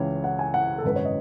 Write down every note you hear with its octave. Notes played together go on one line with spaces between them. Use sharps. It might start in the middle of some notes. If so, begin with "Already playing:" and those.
Already playing: C#2 C#3 E3 C#5
F#5
G#5
F#5
A4
G#1 F#2 C#3 B4
C#5
D#5